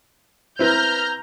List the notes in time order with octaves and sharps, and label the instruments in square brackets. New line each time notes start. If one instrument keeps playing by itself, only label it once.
[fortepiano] C4 E4 B4 [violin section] A#5 F6 G6